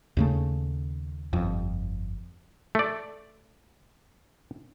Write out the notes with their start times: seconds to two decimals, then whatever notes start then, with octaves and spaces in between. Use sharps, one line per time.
0.17 D#2 C#3 A3
1.33 G1 F2
2.75 A3 D5